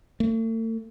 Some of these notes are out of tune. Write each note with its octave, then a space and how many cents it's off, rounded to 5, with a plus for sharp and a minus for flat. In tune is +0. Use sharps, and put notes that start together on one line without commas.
A3 +40